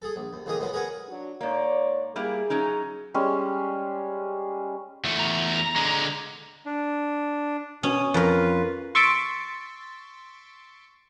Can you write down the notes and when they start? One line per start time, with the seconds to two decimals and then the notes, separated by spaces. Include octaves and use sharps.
0.02 G#4 A4
0.16 A#1
0.33 D#2
0.46 A1 A#2 D#3 G#4 A#4 D#6
0.59 F2 B2 F#3 G#3 B3
0.73 G#4 A#4 B4 C#5 F#5 G#5
1.07 F#3 D4 F#4
1.41 G#2 A#3 C#5 D5
2.16 G3 A#3 E4 G#4
2.50 F#3 C#4 D#4
3.14 G3 G#3 C#4
5.04 E2 A3
5.19 A#5
5.76 D3 G#3
6.66 D4
7.83 B2 C#4 D#6
8.14 F2 F4 A#4 B4
8.95 C6 C#6 E6 A6 B6 D7